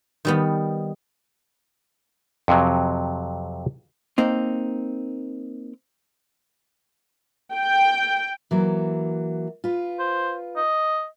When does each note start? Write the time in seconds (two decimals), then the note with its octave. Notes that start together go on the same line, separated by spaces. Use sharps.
0.25 D#3 G3 B3
2.48 F2 C3 F#3
4.18 A#3 C4 D#4
7.55 G5
8.51 E3 F#3 A#3
9.64 F4 B4
9.99 C5
10.57 D#5